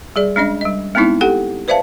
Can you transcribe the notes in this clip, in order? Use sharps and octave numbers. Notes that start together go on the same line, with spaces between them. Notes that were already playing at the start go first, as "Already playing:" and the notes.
G3 G#4 D5
G#3 C#4 D4 D#5
G3 D#5
G#3 B3 C4 D#4 E4
G4 A4 F#5 G5
B4 C5 D5 E5 F5 A5